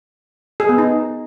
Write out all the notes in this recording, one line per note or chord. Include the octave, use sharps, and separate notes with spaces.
G#4
B3
D#4